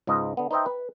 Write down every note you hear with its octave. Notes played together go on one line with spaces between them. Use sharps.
C#2 G#2 F4 D#5
D3 B3
D#4 B4 C5 D#5 E5 G5
B4